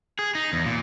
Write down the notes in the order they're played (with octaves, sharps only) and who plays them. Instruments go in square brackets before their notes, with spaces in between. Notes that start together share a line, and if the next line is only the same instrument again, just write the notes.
[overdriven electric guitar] G#4
D#4
E2
A#2